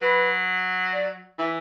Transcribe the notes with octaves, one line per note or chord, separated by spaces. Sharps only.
F#3 B4
D5
E3 E5